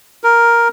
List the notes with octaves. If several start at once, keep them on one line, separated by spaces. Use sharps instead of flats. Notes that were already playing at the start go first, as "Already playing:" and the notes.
A#4